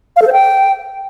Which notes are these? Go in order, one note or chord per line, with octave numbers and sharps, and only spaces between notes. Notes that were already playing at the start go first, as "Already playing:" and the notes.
F5
A4
C5
G5